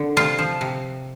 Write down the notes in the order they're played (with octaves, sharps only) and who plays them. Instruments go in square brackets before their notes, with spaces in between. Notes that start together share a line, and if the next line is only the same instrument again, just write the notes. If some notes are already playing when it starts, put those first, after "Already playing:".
Already playing: [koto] D3
C3 F4
F3
C3